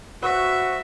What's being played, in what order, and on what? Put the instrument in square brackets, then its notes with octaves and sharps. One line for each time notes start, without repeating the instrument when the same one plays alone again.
[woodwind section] F#4 [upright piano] B4 [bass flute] C5 [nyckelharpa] E5